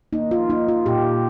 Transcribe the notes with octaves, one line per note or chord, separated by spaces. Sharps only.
A#3 D#4
F4
A#3 D#4
F4
A#2 G4